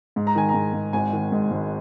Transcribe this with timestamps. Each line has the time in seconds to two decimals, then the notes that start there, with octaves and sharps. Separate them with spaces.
0.16 G#2
0.27 A#5
0.35 D#3 G#5
0.49 A#5
0.54 G#2
0.73 G#2
0.93 G#1 G#5
1.12 D#3
1.32 G#2
1.51 G#1